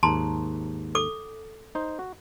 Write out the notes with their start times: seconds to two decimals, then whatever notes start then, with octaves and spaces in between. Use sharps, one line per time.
0.03 D#2 G#2 A5 A#5 C6
0.95 A4 D6
1.75 D#4 C5
1.99 F#4